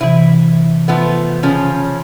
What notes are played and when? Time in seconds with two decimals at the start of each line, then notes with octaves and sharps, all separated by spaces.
0.01 C3 E3 E4
0.88 F3 A3 B3
1.43 C#3 F3 C#4